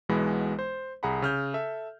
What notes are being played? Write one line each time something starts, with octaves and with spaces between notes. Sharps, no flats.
B1 B2 E3 G#3 B3 B5
C5
C2 G#4 F#5 A#5 B5
C#3 F6 G6
A4 E5